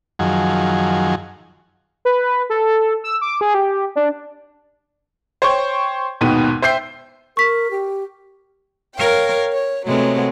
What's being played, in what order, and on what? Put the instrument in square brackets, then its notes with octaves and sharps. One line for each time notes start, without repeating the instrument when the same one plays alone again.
[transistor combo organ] F#2 D#3 F3 F#3 G#4
[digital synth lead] B4
A4
E6
D6
G#4
G4
D4
[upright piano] C5 C#5 G5 C#6 G6
D#2 G#2 B2 D#3 B3 D#7
C5 E5 G5 C6 G6 C7
[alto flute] A#4 [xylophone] C#6 B6
[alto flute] G4
[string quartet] A#4 C#5 F5 G5
C#5
C3 F#3 G#3 A3 B3